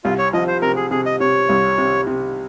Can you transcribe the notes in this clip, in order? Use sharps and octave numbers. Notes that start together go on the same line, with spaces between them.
C2 F4
C#5
F3 D#5
C5
C3 A#4
G#4
C3 G#4
D#5
C3 C#5
C2
C3
C3